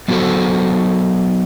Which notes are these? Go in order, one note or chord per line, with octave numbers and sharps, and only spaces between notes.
F#3 B3 F#4 A4 C5